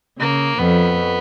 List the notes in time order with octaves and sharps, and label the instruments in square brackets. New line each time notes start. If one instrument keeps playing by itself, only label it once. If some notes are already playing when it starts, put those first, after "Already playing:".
[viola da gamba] C#3 [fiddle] A#3
[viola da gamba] F2 F3 [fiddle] B3